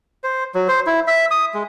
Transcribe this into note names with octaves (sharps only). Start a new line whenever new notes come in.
C5
F#3
C5
E4
E5
D#6
G#3